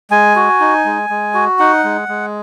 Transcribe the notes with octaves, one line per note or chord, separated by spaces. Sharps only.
G#3 G#5
F#4
D#4
G#3
G#3
F#4
D#4 F#5
G#3
G#3